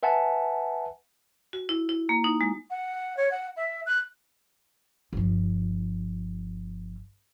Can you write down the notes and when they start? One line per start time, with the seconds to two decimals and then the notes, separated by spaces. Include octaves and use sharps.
0.03 B4 E5 F#5 G#5 A5
1.53 F#4
1.69 E4
1.89 E4
2.09 A#3
2.24 D#4
2.41 G#3
2.70 F#5
3.17 C#5
3.31 F#5
3.56 E5
3.86 F#6
5.13 G1 F3